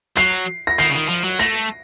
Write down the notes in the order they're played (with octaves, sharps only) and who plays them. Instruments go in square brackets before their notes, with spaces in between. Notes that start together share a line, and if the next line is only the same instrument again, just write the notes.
[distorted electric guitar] F#3 [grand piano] C7
[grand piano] A#6
[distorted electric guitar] D#3 [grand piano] C7
[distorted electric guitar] C#3
D#3
F3
F#3
[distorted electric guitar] A3 [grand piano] A#6